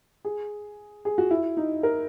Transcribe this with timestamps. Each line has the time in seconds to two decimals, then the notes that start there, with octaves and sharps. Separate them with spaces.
0.25 G#4
1.05 G#4
1.18 F#4
1.31 E4
1.57 D#4
1.83 A#4